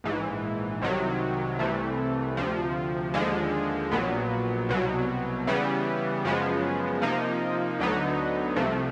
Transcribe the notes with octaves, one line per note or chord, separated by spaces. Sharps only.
A#1 G#2 E3
C2 C3 D#3 F#3
C2 C3 E3 A3
D2 C3 F3
D#2 D3 F3 G#3
A#1 A#2 F#3 B3
C2 B2 F#3
C#3 E3 G3 B3
F#2 C#3 F3 G#3 B3
C3 F3 A#3 D#4
D2 D3 F#3 B3 D#4
C2 C3 F3 A3